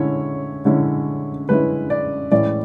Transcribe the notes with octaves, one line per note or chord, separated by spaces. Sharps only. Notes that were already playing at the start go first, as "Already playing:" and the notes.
Already playing: D3 G#3 C#4 E4 C#5
D3 G#3 C#4 E4
D3 G#3 C#4 E4 B4
D5
A2 E3 G#3 C#4 E4 D5